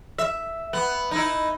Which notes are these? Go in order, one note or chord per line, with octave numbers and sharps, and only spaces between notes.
E5
B3
D#4 E4